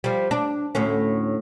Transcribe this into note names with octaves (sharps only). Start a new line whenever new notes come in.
F3 G3
D4
D2 A2 C#4